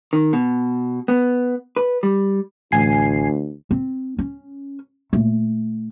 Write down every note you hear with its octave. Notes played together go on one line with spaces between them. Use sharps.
D#3
B2
B3
B4
G3
A1 D2 G#5 C7
C4
C#4
A#2 A3